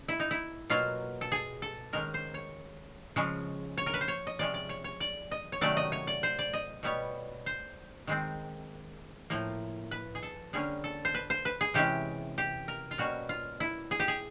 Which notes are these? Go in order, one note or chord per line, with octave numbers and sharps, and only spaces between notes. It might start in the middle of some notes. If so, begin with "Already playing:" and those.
Already playing: C#3
E4
D#4
E4
B2 F#3 A#3 F4
A4
G#4
A4
D#3 G#3 C#4 A#4
C5
C#5
C#3 F3 G#3 C#4
C#5
A#4
B4
C5
C#5
D#5
C3 F3 G#3 C#4 D5
D5
C#5
C#5
D5
D#5
C#5
C3 D#3 F#3 A3 C#4 D5
D#5
C#5
D5
C5
D5
D#5
B2 G3 B3 C#5
C5
D#3 G#3 C4
A2 F3 A#3
B4
G#4
A4
D3 G3 A#3 C#4 G#4
A4
C5
B4
C5
B4
G#4
C3 E3 G#3 C#4 G4
G4
A#4
F4
B2 G3 A#3 C#4 F#4
F4
E4
G#4
G4
G#4